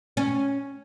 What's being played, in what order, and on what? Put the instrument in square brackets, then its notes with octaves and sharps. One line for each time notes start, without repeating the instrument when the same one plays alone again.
[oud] C#4